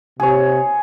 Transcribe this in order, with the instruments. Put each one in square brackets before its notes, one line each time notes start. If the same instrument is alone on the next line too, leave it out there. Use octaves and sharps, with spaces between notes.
[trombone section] C3 [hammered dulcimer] G#4 C#5